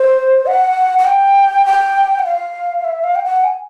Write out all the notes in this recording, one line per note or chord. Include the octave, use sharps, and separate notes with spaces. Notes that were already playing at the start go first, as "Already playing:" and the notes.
Already playing: C5
F#5
F#5
G5
G5
F#5
F5
E5
F5
G5
F#5
G#5